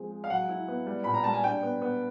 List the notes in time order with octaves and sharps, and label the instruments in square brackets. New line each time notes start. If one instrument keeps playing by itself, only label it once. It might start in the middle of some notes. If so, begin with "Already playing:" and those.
Already playing: [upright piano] F3 G#3 C4
G#3
F5
F#3 F#5
E4
B3
G3
A#2 B5
A#5
G3 A5
G#5
D4 G5
B3
B3